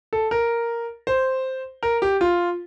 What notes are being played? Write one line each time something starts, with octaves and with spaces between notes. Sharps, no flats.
A4
A#4
C5
A#4
G4
F4